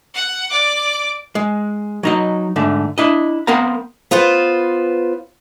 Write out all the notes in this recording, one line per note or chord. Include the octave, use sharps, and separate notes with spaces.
F#5
D5 D6
G#3
F#3 D#4 D#5
G#2 D3 A3
D4 E4 D#5
B3 C4 A#4 F5 A#5
B3 F4 B4 C5